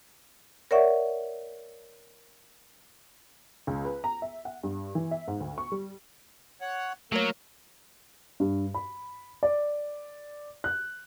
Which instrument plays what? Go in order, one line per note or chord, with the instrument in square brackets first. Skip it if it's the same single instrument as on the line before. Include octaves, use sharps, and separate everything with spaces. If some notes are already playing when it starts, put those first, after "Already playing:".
[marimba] A#4 C#5 D5 E5 F#5 C#6
[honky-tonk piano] C#2
B4
A#5
E5
F#5
G2
E3
E5
G#2
D2
C#6
G3
[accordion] C#5 F#5
[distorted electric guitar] F#3 [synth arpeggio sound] A3 C#5 [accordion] A#3 A#4
[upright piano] G2
B5
D5
F#6